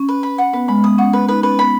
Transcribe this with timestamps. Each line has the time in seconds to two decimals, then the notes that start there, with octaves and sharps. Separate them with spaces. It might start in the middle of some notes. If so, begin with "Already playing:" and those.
Already playing: C#4
0.09 B4
0.23 B5
0.38 F#5
0.53 B3 B4
0.68 G#3 B5
0.83 B3 D#6
0.98 C#4 F#5
1.13 B4
1.28 D#4 B4
1.43 C#4 B4
1.58 B3 B5